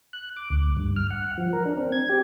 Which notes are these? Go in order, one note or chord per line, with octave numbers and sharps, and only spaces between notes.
F#6
D6
D2
G2
F6
F#5
F3
A#4
D4
C4
G#6
G4